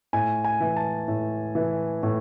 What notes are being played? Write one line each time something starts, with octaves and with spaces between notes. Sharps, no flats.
A2 G#5
G#5
E3
A5
A2
E3
A2